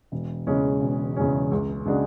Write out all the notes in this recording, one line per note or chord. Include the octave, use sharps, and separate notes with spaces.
E1
E2 C#3 G#3 C#4
E1
E2 C#3 G#3 C#4
C#2
C#3 G#3 D4 F#4